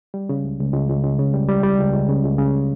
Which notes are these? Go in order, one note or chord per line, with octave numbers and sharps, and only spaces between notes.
G3
C#3
C#2
C#2
C#2
C#2
C#2
C#3
G3
G3
G3
C#2
C#2
C#3
C#2
C#3